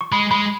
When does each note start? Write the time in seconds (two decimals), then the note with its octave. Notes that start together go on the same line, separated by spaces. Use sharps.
0.01 C#6
0.12 G#3 B5
0.31 G#3 B5